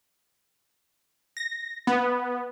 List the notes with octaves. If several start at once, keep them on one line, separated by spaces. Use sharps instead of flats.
A#6
B3